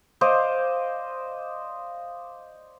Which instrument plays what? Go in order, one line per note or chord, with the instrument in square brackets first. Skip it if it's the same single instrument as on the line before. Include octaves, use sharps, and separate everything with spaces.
[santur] C5 D5 D#5 F5